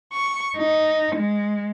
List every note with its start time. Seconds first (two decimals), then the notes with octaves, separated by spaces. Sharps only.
0.13 C#6
0.58 D#4
1.15 G#3